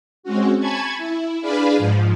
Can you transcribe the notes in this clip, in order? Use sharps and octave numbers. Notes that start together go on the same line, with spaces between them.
G#3 C4 C#4 F#4
G#5 A5 B5 C#6 G#6
E4
D4 G#4 B4 D5 F5 B5
G#2 F3